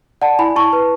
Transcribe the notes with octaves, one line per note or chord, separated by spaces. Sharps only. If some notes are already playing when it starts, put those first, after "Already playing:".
D5 F#5 A5
E4 G#5 B5
E4 A5 C#6
B4